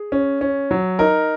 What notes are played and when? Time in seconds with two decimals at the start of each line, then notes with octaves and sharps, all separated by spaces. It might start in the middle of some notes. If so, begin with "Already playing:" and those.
Already playing: G#4
0.12 C#4
0.41 C#4
0.71 F#3
0.99 D#4 A#4